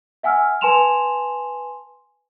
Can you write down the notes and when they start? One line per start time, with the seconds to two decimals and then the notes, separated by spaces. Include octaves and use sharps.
0.23 E5 F#5 G#5 E6 F6
0.61 B4 G#5 A5 C6 E7 F7